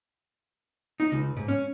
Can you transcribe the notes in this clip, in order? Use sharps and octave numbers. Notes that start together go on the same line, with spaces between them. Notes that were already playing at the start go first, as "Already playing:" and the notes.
D#4
C#2
G#2
C#4